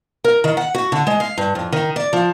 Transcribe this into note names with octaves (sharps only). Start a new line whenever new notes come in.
A#4
D#3
F#5
F#4
D3
G#3
F5
G2
F2
D#3
D5
F3